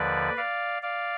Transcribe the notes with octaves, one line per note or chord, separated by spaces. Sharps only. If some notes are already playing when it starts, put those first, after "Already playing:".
Already playing: D#2 D3 F3 B4 D5
D5 F5
D5 F5